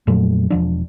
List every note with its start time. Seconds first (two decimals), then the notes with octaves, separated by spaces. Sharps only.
0.07 F2 A#2 F#3 A3
0.50 E1 F3 D4